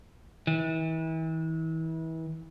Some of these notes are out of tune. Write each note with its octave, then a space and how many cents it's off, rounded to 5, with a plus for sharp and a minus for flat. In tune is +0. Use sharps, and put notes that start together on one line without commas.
E3 -35